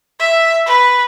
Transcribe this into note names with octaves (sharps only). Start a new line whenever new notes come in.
E5
B4